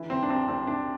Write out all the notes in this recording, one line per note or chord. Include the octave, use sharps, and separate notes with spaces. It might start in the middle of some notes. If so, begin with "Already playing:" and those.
Already playing: D3 E3
C2 C4
D4
C2 C4
C2 C4
C3 D4